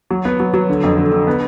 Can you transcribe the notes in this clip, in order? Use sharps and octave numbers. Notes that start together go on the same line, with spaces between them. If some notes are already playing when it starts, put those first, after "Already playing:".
F#3
B3
F#3
F#3
D3
F2
D3
D3
B3